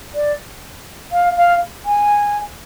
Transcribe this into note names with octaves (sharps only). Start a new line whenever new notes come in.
D5
F5
F5
G#5